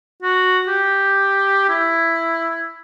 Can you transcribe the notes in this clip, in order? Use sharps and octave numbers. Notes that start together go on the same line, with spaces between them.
F#4
G4
E4